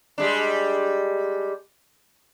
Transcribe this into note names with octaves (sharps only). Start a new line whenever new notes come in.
G3 G#3 D4